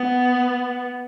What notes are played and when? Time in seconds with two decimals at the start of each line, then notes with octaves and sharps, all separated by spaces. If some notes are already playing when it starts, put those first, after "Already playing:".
Already playing: B3